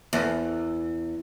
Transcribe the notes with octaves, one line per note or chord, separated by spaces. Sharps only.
E2